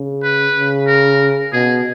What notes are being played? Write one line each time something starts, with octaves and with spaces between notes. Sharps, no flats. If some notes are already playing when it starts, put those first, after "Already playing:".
Already playing: C#3
B4
C#3
A#4
B2 G#4